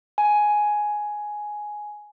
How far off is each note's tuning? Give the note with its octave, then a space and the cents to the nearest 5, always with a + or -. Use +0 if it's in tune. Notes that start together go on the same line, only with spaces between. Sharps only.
G#5 +10